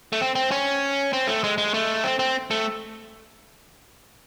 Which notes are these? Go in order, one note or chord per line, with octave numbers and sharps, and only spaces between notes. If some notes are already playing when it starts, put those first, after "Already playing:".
A3
C4
C4
C#4
C4
A3
G#3
G#3
A3
C4
C4
A3